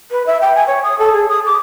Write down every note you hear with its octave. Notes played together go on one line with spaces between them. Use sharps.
B4
E5
G5
G#5
C#5
D#6
A4
G#4
D#6
D6